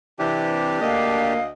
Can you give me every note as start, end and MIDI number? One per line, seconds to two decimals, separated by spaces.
0.19 0.79 48
0.19 0.79 52
0.19 1.33 62
0.19 1.33 67
0.81 1.49 38
0.81 1.38 58
0.81 1.49 75
0.81 1.43 77